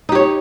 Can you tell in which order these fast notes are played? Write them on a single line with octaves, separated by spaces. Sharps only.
D#4 G4 C#5